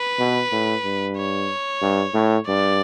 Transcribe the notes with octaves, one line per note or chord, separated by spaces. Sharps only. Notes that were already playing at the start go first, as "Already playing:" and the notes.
Already playing: B4
B2
A2
G2
C#5
G2
A2
G2 D5